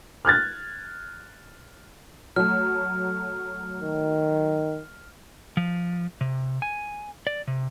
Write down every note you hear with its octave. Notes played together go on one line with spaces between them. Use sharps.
F6 F#6 G#6 A6
F#3 A3 F6
D#3
F3
C3
G#5
D5
C3